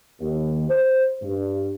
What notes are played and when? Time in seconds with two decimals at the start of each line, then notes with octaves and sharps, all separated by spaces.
0.20 D#2
0.69 C5
1.22 G2